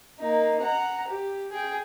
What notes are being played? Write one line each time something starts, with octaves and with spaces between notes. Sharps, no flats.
A#3 D#4
F#5 A#5
G4
G#4 G5